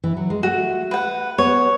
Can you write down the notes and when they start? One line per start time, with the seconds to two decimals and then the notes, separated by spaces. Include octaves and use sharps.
0.04 E3
0.17 F#3
0.30 G#3
0.43 A3 F#4
0.91 B4 F#5
1.38 B3 C#5